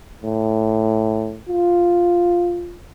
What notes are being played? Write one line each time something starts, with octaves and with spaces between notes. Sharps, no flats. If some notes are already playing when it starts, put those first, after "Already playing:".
A2
F4